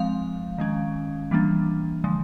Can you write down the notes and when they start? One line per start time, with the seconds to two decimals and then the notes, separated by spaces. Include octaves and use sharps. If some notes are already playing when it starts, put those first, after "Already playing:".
Already playing: F3 G#3 C4 F5
0.58 D#3 G#3 C#4
1.31 E3 G3 A#3 D4
2.04 D3 F3 G#3